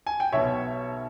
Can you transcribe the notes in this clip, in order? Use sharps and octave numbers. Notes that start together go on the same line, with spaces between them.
G#5
G5
B1 B2 C#5 E5